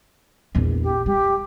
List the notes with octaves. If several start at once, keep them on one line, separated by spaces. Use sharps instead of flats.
A#1 E2
G4
G3 G4